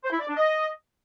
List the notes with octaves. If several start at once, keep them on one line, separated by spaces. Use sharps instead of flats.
C5
E4
D5
D4
D#5